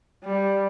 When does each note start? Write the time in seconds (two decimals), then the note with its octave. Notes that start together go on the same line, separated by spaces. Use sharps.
0.24 G3